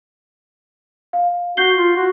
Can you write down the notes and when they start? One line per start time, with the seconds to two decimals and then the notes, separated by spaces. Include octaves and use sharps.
1.13 F5
1.57 F#4 G6 C7 G7
1.75 F4
1.96 F#4